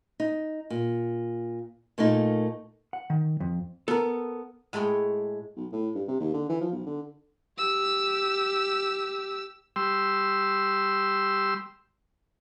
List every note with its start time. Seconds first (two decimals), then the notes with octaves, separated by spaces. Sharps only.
0.20 D#4
0.70 A#2
1.98 A#2 A3 A#3 D#4
2.93 F#5
3.10 D#3
3.40 F2
3.88 B3 A4 A#4
4.73 A2 G#3 A3 G#4 C#5 G5
5.56 B1
5.72 A2
5.95 G2
6.08 C3
6.20 D#2
6.33 D3
6.49 E3
6.61 F3
6.72 B1
6.86 D3
7.58 G4 E6
9.76 G3 C6 E6